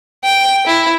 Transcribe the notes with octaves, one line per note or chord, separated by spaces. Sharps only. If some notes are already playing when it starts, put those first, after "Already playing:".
G5
E4